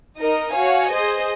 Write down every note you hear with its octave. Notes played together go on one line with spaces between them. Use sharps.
D#4 A#4 D#5
F#4 C#5 F5 G#5
G#4 C5 D#5